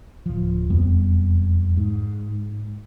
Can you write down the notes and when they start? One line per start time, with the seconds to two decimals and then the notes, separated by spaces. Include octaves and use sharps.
0.26 D1 F3
0.70 E1 F2 G3 B3
1.77 G#2